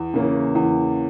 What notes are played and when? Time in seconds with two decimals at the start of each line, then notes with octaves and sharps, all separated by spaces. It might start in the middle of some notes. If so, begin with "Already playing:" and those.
Already playing: E2
0.14 C#3 E3 A#3 C#4
0.55 E2